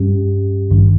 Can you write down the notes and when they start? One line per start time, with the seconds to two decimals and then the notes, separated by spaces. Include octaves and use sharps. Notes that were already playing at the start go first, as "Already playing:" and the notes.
Already playing: G2 G3 C#4 G4
0.71 G#1 G2 D#3